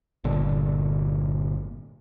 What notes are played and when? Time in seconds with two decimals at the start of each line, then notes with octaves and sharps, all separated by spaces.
0.24 G1 A#2 D3